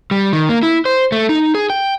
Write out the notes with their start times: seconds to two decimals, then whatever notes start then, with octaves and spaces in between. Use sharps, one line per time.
0.11 G3
0.33 D#3
0.49 A#3
0.63 E4
0.85 C5
1.12 A3
1.29 D#4
1.55 G#4
1.70 G5